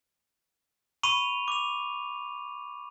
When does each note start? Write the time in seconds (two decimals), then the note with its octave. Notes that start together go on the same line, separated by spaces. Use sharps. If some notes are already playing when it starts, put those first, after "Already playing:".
1.03 B5 C#6 D#7 F7
1.48 D6 F7